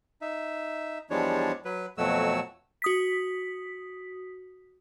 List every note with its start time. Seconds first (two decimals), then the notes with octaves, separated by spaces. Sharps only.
0.21 D#4 E5
1.10 E2 F3 G3 G#3 D4 C#5
1.65 F#3 B4
1.97 F2 B2 F#3 A3 F#4 E6
2.82 F#4 D#6 B6